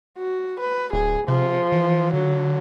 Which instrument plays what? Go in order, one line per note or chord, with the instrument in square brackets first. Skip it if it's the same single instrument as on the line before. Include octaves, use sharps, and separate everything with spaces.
[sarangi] F#4
B4
[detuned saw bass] D1 [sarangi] G#4
[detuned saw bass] C3 [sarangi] F3
[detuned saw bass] E3
[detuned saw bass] D3 [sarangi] F#3